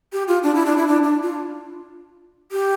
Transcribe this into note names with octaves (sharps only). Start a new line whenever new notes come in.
G4
F4
D4
E4
D4
E4
D4
D4
F4
G4